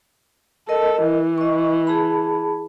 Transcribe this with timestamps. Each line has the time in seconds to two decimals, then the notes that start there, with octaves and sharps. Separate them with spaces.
0.69 A4 A#4 D#5
1.02 E3
1.38 D#5 C#6
1.87 G#4 A5 B5